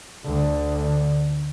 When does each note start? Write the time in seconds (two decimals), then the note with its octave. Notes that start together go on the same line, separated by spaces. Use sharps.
0.23 D2 D3